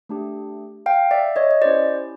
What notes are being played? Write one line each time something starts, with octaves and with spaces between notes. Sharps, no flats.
A3 D4 G4
F5 G5
D5 E5
C#5 D#5
D#5
C#4 E4 G4 C5 D5